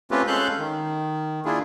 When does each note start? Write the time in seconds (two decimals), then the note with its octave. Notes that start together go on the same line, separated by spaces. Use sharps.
0.11 A3 C4 C#4 F4 G4 B4
0.27 G#3 C#4 A4 F5 F#6 G6
0.59 D#3
1.45 A#3 D4 E4 F4 G#4